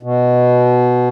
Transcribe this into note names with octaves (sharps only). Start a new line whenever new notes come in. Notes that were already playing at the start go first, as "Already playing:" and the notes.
B2